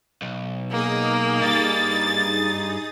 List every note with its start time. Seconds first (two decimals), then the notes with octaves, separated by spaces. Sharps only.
0.22 B1
0.71 A#3 D#4 G#4 D#6
1.43 G2 G4 A6